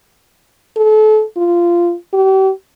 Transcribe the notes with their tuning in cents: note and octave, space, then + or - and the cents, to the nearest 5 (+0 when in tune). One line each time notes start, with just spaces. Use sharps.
A4 -35
F4 -15
G4 -40